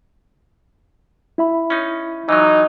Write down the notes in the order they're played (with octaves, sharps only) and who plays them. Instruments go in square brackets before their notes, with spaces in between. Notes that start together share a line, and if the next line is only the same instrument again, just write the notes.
[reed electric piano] E4 E5 B5
[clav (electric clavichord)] C#4 D#4
[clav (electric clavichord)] E3 F#3 [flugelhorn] D#4